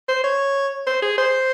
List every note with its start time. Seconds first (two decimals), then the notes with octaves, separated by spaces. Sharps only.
0.08 C5
0.24 C#5
0.87 C5
1.02 G#4
1.18 C5